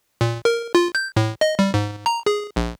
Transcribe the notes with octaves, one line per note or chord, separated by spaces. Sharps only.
A#2
A#4
F4
G6
A2
D#5
G3
G#2
A#5
G#4
A#1